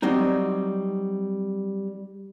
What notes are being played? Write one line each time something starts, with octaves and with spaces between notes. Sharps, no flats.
F#3 G3 C4 D#4